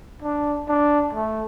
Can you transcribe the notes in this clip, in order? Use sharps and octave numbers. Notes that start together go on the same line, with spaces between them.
D4
D4
A3